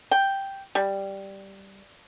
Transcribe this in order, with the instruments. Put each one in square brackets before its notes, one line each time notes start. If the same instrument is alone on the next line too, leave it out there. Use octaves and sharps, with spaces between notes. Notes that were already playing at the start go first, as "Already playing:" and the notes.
[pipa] G5
G3